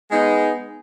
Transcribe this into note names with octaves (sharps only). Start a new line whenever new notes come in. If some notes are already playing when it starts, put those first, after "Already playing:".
G#3 B3 D#4